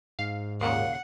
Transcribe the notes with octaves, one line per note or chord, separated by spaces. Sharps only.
G#2 F5
D#2 A#2 C#3 F5 F#5